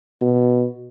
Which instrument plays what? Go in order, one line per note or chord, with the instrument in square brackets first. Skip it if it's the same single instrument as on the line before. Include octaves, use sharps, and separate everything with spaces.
[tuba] B2